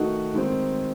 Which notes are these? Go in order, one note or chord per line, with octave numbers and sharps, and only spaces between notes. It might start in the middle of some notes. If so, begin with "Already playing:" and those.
Already playing: D#3 A3 D#4 F#4
D#3 G#3 C4